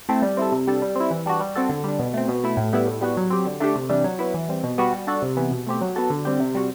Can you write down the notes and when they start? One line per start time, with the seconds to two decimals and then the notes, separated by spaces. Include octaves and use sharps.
0.09 A3 C4 E4 A4
0.22 G3
0.37 C4 E4 A4
0.52 C3
0.67 G3 D4 A4
0.82 G3
0.96 C4 E4
1.11 E3
1.26 G3 D4 F#4
1.40 G3
1.55 C4 F#4 A4
1.69 D3
1.84 G3 D4
1.99 B2
2.13 A3 C4
2.28 B2
2.44 A3 E4
2.57 A2
2.73 G3 B3 E4
2.87 A2
3.01 G3 B3 F#4
3.17 F#3
3.30 C4 G4
3.46 D3
3.60 A3 D4 G4
3.76 C3
3.89 E3 G3 D4
4.04 F#3
4.19 B3 E4
4.34 E3
4.49 G3 C4
4.63 B2
4.78 G3 B3 F#4
4.93 G3
5.07 D4 F#4 A4
5.22 C3
5.37 E3 B3
5.51 B2
5.66 A3 C4 G4
5.81 F#3
5.96 B3 F#4 A4
6.10 D3
6.25 G3 C4 G4
6.40 C3
6.55 G3 C4 F#4